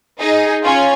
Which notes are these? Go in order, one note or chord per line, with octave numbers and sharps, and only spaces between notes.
D#4 G#4
C#4 F4